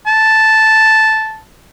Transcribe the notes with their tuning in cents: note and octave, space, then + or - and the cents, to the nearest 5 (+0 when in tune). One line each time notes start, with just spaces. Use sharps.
A5 -5